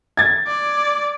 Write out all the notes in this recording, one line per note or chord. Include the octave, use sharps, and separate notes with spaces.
G#6 A6
D5